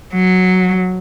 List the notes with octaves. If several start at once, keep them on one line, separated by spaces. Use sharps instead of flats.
F#3